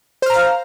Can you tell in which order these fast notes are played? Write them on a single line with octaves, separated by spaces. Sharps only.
C5 F6 A#5 F5